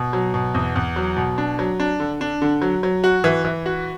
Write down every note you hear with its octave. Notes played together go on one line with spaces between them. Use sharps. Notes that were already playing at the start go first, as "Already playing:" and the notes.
Already playing: B2
F#3
B2
E2
E2
F#3
B2
D4
F#3
D4
D3
D4
D3
F#3
F#3
F#4
E3
E3
F#4